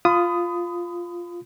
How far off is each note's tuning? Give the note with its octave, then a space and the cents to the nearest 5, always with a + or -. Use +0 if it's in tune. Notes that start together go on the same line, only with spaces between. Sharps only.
F4 +0 B5 +35 D#6 +0